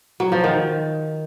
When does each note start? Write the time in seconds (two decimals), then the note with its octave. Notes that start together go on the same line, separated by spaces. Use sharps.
0.20 F#3
0.32 F3
0.44 D#3